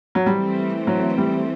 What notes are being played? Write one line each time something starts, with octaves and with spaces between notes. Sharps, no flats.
F#3
E3 G3 A3 C4
F#3
G3